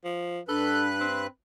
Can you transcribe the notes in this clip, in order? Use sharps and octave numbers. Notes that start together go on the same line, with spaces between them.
F3
G2 D4 A4 B4 F#6
C4